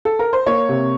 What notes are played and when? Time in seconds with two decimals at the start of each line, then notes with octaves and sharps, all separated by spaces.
0.05 A4
0.19 A#4
0.33 C5
0.46 A#3 C#5
0.69 C3